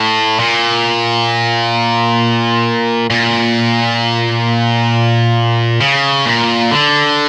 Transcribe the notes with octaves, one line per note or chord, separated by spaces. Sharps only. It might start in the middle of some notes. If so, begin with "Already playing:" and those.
Already playing: A2
A#2
A#2
C#3
A#2
D3